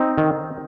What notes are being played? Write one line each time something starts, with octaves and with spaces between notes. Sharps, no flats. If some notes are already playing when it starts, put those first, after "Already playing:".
Already playing: C4 D#4
D#3